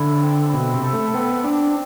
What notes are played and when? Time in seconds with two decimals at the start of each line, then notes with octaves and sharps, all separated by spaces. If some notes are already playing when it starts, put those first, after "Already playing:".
Already playing: D3 E4
0.22 C4
0.52 B2 E4
0.74 C3
0.83 A4
0.93 A3
1.13 B3 C4
1.44 C4 D4